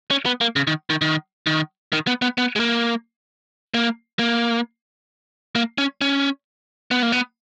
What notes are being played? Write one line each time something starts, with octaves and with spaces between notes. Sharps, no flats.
C#4
B3
A#3
C#3
D#3
D#3
D#3
D#3
D#3
B3
B3
B3
G#3
A#3
A#3
A#3
A#3
C#4
C#4
B3
A#3
B3